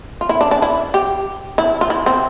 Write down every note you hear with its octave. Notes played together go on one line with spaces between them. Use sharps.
F4
E4
D4
D4
E4
G4
E4
F4
E4
C4